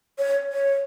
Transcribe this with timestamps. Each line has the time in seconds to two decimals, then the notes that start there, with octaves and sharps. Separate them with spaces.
0.18 C#5
0.53 C#5